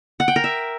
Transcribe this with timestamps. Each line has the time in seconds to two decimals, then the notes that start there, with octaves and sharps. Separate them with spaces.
0.20 F#5
0.28 G5
0.36 A#4
0.44 E5